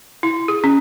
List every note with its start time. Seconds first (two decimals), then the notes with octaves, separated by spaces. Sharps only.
0.23 E4
0.48 G#4
0.64 C#4